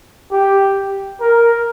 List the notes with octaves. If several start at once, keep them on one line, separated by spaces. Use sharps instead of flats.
G4
A#4